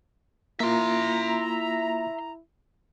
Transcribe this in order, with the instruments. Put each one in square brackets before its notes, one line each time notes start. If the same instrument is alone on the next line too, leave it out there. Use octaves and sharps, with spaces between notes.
[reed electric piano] A#3 F4 [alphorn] E4 [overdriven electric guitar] E5 C6 [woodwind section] A#5